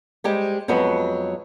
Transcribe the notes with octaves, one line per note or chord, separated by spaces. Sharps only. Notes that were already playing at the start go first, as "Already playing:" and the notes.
G3 G#3 G4 C5
F2 F#3 G#3 B3 F#4